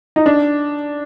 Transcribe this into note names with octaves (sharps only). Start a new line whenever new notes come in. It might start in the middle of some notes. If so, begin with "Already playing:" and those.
D#4
D4